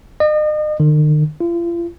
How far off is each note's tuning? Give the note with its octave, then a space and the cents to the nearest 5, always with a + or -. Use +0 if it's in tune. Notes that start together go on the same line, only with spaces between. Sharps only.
D#5 -40
D#3 -45
F4 -40